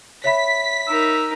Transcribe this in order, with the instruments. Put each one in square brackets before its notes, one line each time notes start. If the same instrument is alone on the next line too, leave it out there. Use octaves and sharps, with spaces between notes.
[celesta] C#5 E5 B5 [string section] B6
[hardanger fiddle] D#4 A#4 [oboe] E6